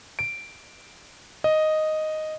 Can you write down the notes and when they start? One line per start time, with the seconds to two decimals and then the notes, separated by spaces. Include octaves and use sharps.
0.19 D7
1.44 D#5